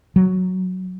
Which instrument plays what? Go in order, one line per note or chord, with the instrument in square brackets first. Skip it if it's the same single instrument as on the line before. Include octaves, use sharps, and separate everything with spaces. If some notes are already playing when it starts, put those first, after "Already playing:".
[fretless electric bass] F#3